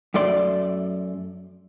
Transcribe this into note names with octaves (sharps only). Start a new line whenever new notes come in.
F#2 A3 D5 C6